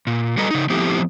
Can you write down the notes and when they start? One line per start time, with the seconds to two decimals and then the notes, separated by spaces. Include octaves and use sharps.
0.07 A#2
0.37 F#3 G3 A4 B4 D#5 A#5
0.51 C#3 D#4
0.70 F3 A3 B3 C4 E4 G4